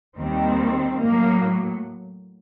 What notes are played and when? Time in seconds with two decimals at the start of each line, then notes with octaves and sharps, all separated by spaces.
0.16 D#2 D#3 G3 C4
1.00 A2 F#3 A#3